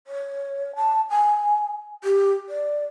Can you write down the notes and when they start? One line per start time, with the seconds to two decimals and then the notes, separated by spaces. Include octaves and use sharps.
0.07 C#5
0.76 A5
1.10 G#5
2.04 G4
2.49 D5